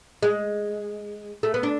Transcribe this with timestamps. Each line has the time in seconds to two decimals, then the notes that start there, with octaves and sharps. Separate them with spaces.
0.23 G#3
1.43 A3
1.54 B3
1.63 D4